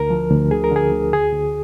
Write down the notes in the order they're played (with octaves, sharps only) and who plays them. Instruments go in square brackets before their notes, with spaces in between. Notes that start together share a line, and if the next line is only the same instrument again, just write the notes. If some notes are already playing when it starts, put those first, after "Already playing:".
Already playing: [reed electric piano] D2 A#4
F3
D2
D3 G#4
A#4
D3 G#4
D2
D2 G#4
D2